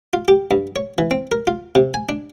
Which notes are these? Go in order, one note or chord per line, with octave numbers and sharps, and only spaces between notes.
F4
G4
G2
C#5
E3
C4
A#4
F4
C3
G#5
D4